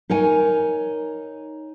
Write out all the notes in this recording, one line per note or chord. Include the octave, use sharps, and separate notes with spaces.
D#4 A#4 C#5 G#5